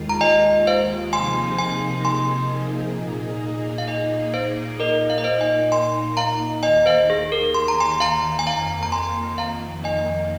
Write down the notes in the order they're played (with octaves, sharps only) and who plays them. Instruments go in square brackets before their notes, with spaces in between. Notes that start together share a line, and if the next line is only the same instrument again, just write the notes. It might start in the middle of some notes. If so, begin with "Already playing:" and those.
Already playing: [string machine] D#2 D#3 G#3 F4
[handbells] A#5
D#5 G#5
C5 F5
[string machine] C3 F3 A#3 D#4 G#4 [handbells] G#5 C6
[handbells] G#5 C6
G#5 C6
[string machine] A#2 A#3 D#4 G#4
[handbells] F5
D#5 G#5
C5 F5
[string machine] A#2 A#3 D#4 [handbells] A#4 D#5
[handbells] F5
D#5
C5 F5
D#5 G#5
G#5 C6
F5 A#5
[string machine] D#2 D#3 A#3 [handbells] D#5 G#5
[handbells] C5 F5
G#4
A#4
C6
A#5
G#5 C6
F5 A#5
G#5
[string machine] F2 D#3 A#3 [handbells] F5 A#5
[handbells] A#5
G#5 C6
F5 A#5
D#5 G#5